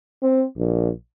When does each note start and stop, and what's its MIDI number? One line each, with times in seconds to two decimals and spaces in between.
0.23 0.44 60
0.58 0.91 34